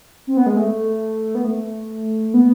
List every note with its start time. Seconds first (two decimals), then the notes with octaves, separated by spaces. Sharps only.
0.27 C4
0.37 B3
0.46 G#3
0.57 A3
1.35 B3
1.44 A3
2.34 B3